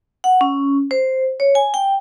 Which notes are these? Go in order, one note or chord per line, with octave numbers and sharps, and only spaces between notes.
F#5
C#4
C5
C#5
G#5
G5